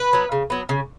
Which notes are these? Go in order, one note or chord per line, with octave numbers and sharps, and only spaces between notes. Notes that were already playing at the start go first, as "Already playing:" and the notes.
Already playing: B4
F#3 B3
C#3
F#3 B3
C#3